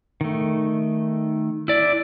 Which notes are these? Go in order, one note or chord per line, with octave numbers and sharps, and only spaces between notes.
D#3 A3
E4 D5